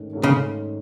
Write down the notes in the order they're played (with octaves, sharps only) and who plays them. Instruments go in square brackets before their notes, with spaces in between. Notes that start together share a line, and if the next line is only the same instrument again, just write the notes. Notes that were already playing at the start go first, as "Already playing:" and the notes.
Already playing: [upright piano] G#2 D#3 A3 C#4
G#2 D#3 A3 C#4
[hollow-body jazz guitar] C#3